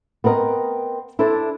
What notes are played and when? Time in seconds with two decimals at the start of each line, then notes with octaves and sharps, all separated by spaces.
0.24 B3 C4 A#4 D#5
1.19 D4 E4 A4 C5